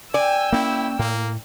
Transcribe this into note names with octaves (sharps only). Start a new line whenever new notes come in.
D5 G5 G#5 E6
A#3 C#4 E4
A2 A#3